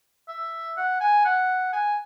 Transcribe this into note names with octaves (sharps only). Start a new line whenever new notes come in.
E5
F#5
G#5
F#5
G#5